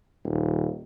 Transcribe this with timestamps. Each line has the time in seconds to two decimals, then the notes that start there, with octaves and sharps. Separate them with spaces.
0.25 D#1